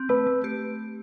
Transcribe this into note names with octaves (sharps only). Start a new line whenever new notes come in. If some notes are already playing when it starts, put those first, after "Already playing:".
Already playing: C4
A3 B4
A3
G4